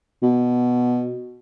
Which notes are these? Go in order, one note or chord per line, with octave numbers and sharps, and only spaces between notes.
B2